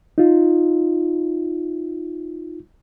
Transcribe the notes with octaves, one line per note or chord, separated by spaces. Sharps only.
D#4 F4